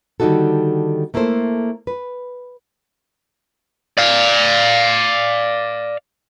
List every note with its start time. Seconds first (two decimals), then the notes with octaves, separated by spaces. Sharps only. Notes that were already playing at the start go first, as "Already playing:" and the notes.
0.20 D3 D#3 G3 D#4 F#4 A4
1.14 A3 A#3 E4 A4 C5
1.87 B4
3.98 D5 F5